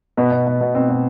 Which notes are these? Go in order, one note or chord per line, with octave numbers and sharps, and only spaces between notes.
B2 B3
B2
B2
B2
B2 C4
B2